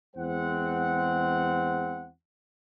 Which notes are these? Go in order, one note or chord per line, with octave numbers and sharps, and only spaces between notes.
E2 G#3 C4 C5 F#5